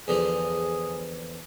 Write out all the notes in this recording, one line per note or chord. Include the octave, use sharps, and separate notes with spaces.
E2 D3 F3 G#4